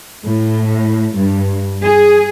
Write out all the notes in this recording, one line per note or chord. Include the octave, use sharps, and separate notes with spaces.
A2
G2
G#4